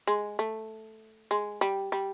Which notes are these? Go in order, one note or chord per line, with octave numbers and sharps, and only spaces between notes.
G#3
A3
G#3
G3
G3